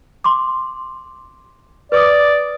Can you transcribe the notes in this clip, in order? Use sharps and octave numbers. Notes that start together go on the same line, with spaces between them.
C6 D6
B4 D5 D6 D#6